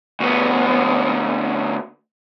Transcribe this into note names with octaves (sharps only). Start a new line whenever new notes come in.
D2 B3